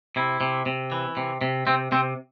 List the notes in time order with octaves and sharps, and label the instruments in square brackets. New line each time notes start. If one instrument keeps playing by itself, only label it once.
[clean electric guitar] C3 E4
C3
C3
E3
C3
C3
C3 C4
C3 C4